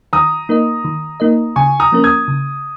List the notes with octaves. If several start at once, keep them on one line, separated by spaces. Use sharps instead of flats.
D#3 A#5 D#6
A#3 D#4 A#4 D#5
D#3
A#3 D#4 A#4 D#5
C#3 G#5 C#6
A#5 D#6
F3 A#3 C#4 A#4
D#6 G#6
C#3